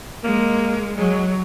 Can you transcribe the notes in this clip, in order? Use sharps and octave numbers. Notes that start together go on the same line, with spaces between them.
G#3 A#3
F#3 G#3